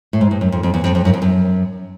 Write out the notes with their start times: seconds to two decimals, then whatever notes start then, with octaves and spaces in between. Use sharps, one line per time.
0.13 A2
0.21 G#2
0.31 G2
0.41 F#2
0.52 F2
0.63 F2
0.74 E2
0.84 F2
0.95 F2
1.05 F#2
1.13 F2
1.22 F#2